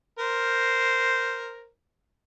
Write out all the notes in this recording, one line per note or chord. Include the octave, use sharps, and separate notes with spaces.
A#4 C5